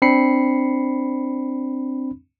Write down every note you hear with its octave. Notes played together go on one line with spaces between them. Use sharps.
C4 D4 B5 C7 C#7